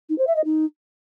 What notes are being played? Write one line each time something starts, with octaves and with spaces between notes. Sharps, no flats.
D#4
C5
E5
D#5
D#4